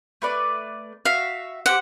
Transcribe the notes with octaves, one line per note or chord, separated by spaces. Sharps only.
A3 B4 D5
F#4 E5 F5
G4 G#4 C5 F#5